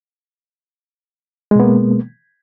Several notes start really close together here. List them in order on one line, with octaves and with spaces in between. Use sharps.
G#3 B2 B3 A#3